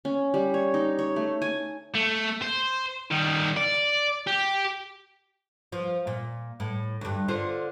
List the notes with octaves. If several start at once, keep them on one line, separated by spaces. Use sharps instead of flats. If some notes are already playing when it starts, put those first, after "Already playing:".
C#4
G3
C#5
D#4
C#5
A3
G#5
A3
C5
D#3 G3
D5
G4
F3
A#2
A2
D2 G2
D3 F4 C5